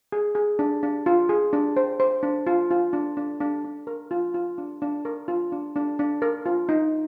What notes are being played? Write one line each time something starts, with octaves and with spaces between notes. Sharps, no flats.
G#4
G#4
D4
D4
F4
G#4
D4
C5
C5
D4
F4
F4
D4
D4
D4
D4
A#4
F4
F4
D4
D4
A#4
F4
D4
D4
D4
A#4
F4
D#4